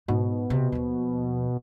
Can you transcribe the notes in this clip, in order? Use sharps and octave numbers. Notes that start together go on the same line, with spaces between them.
G#2 B2 D#4
C3
D#2 F3